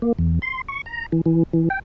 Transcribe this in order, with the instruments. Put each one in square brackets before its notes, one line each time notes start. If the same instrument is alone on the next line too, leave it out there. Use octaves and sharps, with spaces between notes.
[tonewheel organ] A#3
E2
C6
C#6
A#5
E3
E3
E3
G5